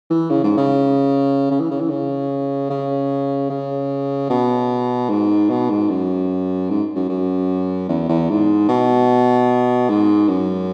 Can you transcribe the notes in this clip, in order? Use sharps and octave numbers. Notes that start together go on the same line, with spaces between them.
E3
C#3
G#2
C#3
C#3
E3
C#3
E3
C#3
C#3
C#3
B2
G#2
B2
G#2
F#2
G#2
F#2
F#2
E2
E2
G#2
B2
G#2
F#2